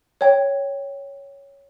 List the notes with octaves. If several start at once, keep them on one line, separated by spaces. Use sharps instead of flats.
C#5 G5